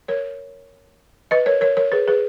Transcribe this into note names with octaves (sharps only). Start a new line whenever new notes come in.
A#4 C#5
B4 D#5
A#4 C#5
A#4 C#5
A#4 C#5
G#4 B4
G#4 B4